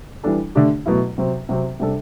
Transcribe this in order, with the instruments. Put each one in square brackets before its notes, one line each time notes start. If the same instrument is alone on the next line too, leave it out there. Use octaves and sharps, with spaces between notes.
[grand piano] E3 G3 D4 A4
D3 A3 D4 G4
B2 F#3 A3 E4
C3 F#3 C4
C3 F#3 C4
C3 G3 D4 A4